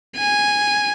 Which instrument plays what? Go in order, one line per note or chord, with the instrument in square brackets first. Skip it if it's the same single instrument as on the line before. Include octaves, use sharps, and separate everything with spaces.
[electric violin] G#5